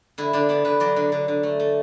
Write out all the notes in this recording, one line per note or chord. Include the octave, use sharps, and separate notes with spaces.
D3 E4
D3 D4
B3 D5
D3 B4
F#3 D5
D3
D3
D3
A3
A3